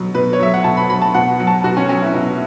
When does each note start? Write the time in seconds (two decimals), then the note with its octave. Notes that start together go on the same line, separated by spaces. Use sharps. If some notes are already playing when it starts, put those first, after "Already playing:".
Already playing: B2 F#3
0.15 B2 B4
0.33 C#5
0.40 F#3 E5
0.54 F#5
0.64 B2 A5
0.77 B5
0.89 F#3 B5
1.02 A5
1.14 B2 F#5
1.40 F#3
1.47 A5
1.64 B2 F#4
1.77 C#4
1.89 F#3 C#4
2.02 E4
2.14 B2 E4